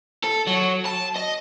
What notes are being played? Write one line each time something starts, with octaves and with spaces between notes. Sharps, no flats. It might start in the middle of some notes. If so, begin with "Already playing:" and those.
A4
F#3
A5
D#5